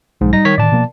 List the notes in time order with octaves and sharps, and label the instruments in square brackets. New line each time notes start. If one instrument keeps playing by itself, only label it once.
[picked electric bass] B1 F3 [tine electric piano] G#2
[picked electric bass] G3 [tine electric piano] D#4 A#6
[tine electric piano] D#3 C#5 B6
[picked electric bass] A2 D#3 [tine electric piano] D5 A5
[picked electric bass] B2 F3 A#3